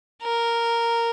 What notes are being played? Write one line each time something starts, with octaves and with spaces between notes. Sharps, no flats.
A#4